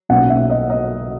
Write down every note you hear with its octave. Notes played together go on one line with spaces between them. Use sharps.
B1 A#2 F#3 C#4 F#5
E5
D#5
D#5